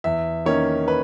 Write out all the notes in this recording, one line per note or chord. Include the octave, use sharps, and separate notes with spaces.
E2 E5
D#3 A#3 C#4 C#5
B4